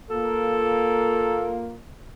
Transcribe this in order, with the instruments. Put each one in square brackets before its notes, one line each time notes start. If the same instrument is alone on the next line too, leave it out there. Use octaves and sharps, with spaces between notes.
[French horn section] A#3 F4 [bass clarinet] A4